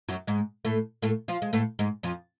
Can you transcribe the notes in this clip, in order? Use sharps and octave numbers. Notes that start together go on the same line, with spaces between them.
F#2 F#3
G#2 G#3
A2 A3
A2 A3
F3 F4
G#3
A2 A3
G#2 G#3
F2 F3